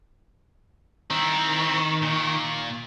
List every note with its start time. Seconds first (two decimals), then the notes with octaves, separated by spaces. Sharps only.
1.10 D#3 C4 E4
2.03 A#2